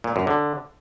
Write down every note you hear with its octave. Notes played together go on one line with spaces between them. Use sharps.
A#2
F#2
D3